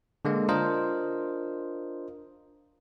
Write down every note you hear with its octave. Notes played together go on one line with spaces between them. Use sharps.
D3 G#3 A#3
D4 F4 A#4 C5 D#5